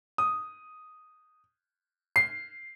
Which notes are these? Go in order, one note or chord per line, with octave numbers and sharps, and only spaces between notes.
D#6
C7